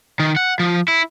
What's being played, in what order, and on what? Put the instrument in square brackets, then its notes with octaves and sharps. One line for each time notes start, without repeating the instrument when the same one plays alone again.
[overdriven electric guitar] D#3
F#5
F3
E4